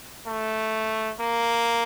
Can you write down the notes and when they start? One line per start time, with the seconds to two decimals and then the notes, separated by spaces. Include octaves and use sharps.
0.27 A3
1.20 A#3